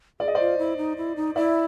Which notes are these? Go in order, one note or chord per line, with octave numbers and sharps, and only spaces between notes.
G#4 D5
D#5
F4 C5 D5
E4
D#4
E4
D#4
E4 D5 E5